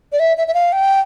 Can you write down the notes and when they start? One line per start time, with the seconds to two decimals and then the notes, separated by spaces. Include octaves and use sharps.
0.12 D5
0.20 E5
0.37 E5
0.48 E5
0.54 F5
0.72 G5